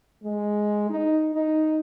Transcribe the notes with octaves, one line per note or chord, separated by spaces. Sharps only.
G#3
D#4
D#4